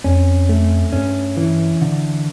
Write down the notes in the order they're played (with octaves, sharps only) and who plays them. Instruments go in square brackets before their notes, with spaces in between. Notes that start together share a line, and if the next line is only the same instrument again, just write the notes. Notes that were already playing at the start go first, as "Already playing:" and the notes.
[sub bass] F2 [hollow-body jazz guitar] C#4
[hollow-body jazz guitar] A3
[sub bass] G2 [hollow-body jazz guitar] C#4
[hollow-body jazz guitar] E3
D3